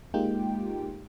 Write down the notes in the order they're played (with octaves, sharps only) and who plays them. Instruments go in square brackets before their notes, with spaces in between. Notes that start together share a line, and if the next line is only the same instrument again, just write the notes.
[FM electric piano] G#3 A#3 D#4 F4 G4 G5